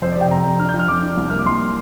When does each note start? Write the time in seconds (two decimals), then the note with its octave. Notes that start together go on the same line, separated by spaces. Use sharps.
0.02 F2 C5
0.12 D5
0.17 C3 G5
0.30 F2 A#5
0.44 F2
0.59 D4 F6
0.69 G6
0.74 F3
0.79 F6
0.88 F2 D6
1.02 D4
1.17 C2
1.30 A#3 F6
1.39 D6
1.45 C2 C6